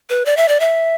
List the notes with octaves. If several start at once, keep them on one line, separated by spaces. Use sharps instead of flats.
B4
D5
E5
D5
E5